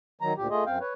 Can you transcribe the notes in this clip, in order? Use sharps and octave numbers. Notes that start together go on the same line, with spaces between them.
D#3 F#3 A#5
D2 A#2 G4
A3 F4 G#4 D#5
F#2 C4 F5 G5
B4 C#5